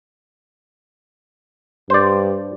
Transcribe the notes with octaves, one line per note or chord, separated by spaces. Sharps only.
G2 C5 D5